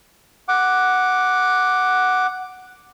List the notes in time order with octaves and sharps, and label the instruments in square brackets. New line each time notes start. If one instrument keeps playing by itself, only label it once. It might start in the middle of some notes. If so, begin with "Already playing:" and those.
[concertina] F#5 D6